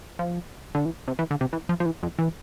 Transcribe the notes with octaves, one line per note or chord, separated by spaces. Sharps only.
F3
D3
E3
C3
E3
D3
C3
E3
F3
F3
E3
F2
E3